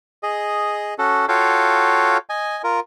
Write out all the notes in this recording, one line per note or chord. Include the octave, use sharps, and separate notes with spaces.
G#4 D#5
C#4 F#4 A4
F4 F#4 A4 C#5 F5 G5
D#5 G#5
F4 A#4